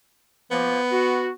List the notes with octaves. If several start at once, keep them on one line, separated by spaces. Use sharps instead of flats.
F3 A#3 B3
F#4